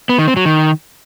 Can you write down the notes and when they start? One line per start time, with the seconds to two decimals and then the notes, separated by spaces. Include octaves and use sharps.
0.09 B3
0.18 D#3
0.27 C4
0.37 F#3
0.46 D#3